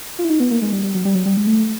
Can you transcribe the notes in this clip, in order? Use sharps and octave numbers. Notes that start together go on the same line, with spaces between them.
F4
E4
D#4
B3
A#3
G#3
G3
G3
F#3
G3
F#3
G3
G#3
A3